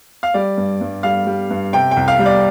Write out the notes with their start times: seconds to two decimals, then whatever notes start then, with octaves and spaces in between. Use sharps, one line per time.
0.23 F5
0.34 G3 D5
0.57 G2
0.81 G2
1.03 G3 F5
1.27 G3
1.50 G2
1.73 C3 G5
1.91 G5
1.96 C2
2.08 F5
2.19 G3
2.26 D5